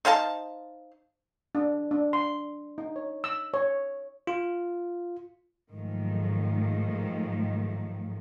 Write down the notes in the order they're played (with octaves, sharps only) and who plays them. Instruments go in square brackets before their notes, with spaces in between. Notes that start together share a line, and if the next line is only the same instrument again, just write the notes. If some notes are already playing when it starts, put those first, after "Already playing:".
[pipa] D#4 C5 F5 A5
[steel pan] D4
D4
C6
D#4
C#5
E6
C#5
[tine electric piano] F4
[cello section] G#2 D#3 F3 F#3 A3